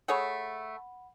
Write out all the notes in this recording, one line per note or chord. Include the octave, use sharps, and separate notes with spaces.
A3 G#4 C#5 F#5 B5